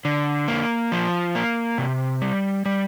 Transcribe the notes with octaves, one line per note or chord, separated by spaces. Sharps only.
D3
A#3
F3
A#3
C3
G3
G3